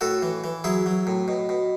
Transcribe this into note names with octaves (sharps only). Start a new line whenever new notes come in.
A2 F#4 A4
E3
E3
F#3 E4 G#4
F#3
A2
B2
B2